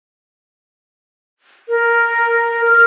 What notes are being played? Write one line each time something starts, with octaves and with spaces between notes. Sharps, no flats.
A#4
F6